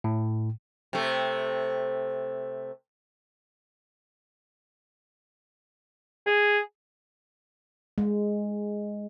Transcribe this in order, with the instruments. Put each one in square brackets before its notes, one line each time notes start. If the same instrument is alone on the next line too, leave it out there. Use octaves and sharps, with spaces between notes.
[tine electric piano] A2
[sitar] C3 A3
[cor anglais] G#4
[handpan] G#3